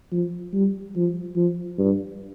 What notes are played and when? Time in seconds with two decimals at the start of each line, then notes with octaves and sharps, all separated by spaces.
0.12 F3
0.53 G3
0.96 F3
1.36 F3
1.78 G2